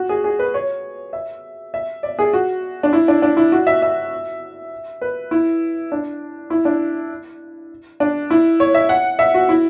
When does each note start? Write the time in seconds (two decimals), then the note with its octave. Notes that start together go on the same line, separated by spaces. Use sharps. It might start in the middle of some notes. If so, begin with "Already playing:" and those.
Already playing: F#4
0.09 G#4
0.24 G#4
0.39 B4
0.54 C#5
1.13 E5
1.74 E5
2.03 D5
2.19 G#4
2.33 F#4
2.83 D4
2.93 E4
3.08 D4
3.22 D4
3.37 E4
3.52 F#4
3.67 E5
3.82 E5
5.01 B4
5.31 E4
5.92 D4
6.50 E4
6.65 D4
8.00 D4
8.30 E4
8.60 C#5
8.75 E5
8.89 F#5
9.19 E5
9.34 F#4
9.49 E4